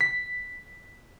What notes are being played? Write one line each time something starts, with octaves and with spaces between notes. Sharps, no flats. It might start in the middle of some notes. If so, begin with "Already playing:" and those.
B6